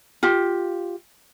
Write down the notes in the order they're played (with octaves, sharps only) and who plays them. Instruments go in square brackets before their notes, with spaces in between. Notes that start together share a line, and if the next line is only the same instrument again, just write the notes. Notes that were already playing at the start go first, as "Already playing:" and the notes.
[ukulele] F4 G4